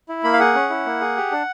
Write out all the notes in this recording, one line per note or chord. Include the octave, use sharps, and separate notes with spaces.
E4
A#3 B5
F5
G#4 F#5
C#4
E4
A#3
G#4
G4
D4